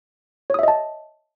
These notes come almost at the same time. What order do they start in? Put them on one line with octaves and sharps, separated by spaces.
C#5 D#6 E5 D#5 A5